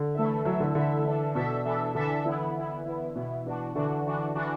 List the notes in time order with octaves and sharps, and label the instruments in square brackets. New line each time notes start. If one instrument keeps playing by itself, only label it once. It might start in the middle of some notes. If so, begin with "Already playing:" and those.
Already playing: [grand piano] D3
[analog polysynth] E3 A3 E4 A4 E5
[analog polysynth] E3 A3 E4 A4 E5 [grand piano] F#3
[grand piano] D3
[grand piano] D3 [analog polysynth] E3 A3 E4 A4 E5
[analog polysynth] E3 D4 A4 E5
[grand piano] B2 [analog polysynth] E3 D4 A4 E5
[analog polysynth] E3 D4 A4 E5
[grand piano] D3 [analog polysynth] E3 D4 A4 E5
[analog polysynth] E3 B3 E4
E3 B3 E4
E3 B3 E4
[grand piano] B2 [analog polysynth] E3 B3 E4
[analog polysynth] E3 D4 F#4
[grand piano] D3 [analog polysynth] E3 D4 F#4
[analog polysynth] E3 D4 F#4
E3 D4 F#4